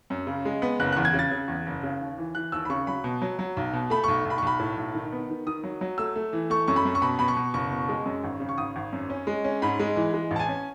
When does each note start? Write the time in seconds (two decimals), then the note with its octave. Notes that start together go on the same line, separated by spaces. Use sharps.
0.10 F#2
0.27 C#3
0.45 G#3
0.62 B3
0.79 F#1 F#6
0.92 E2 F#6
1.05 G#6
1.13 C#3
1.19 A6
1.31 C#3
1.48 E2
1.66 F#1
1.83 C#3
2.01 D#2
2.18 E3
2.35 E3 F#6
2.52 D#2 E6
2.65 B5
2.70 C#3 C#6
2.87 F#3 B5
3.04 B2
3.22 F#3
3.39 F#3
3.57 B1
3.73 B2
3.90 A3 B5
4.04 B1 C#6
4.25 B1 B5
4.38 C#6
4.42 B1 B5
4.60 A2
4.77 B1
4.95 D#3
5.12 B3
5.30 D#3
5.46 D#3 D#6
5.64 F#3
5.81 F#3
5.98 A3 E6
6.16 A3
6.33 E3
6.50 A3 C#6
6.68 F#2 C#6
6.76 B5
6.85 F#2
6.95 C#6
7.02 B2 B5
7.19 B2 B5
7.28 C#6
7.37 B2
7.54 F#1 C#6
7.71 B2
7.89 G#3
8.06 F#2
8.24 G#1
8.40 C#3
8.49 C#6
8.58 G#1 D#6
8.76 G#1
8.93 F#2
9.10 C#4
9.27 G#3
9.44 C#4
9.62 G#2 B5
9.79 G#3
9.96 E3
10.14 G#3
10.31 A1
10.36 A5
10.39 G#5
10.48 C#4